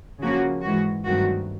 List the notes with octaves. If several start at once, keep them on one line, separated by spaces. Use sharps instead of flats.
C#3 F3 A#3 C#4 F#4
G#2 E3 G#3 F#4
G2 D#3 F#3 A3 C4 F#4